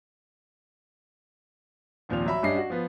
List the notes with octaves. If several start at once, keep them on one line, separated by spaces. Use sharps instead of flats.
D#2 A#2 F3 C4 F7
F#3 E5 B5
G2 G3 C#4 D4 D#5 C7
F#4
F3 B3